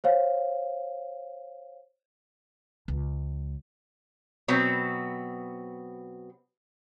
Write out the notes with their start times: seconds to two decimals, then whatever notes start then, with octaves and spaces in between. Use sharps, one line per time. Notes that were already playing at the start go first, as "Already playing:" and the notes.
0.04 C5 C#5 F5
2.88 C#2
4.48 B2 F#3 B3 C4